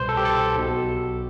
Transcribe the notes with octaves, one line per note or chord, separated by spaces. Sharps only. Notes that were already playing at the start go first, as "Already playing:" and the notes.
Already playing: C2 B2 B4 C5
A4
G4
A4
B1 B2